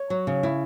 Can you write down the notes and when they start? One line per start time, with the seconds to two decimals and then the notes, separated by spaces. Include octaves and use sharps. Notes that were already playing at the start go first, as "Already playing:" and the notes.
Already playing: C#5
0.10 F#3
0.27 C#3
0.43 E4